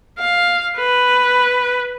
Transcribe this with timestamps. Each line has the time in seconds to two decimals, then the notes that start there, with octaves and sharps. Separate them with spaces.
0.19 F5
0.77 B4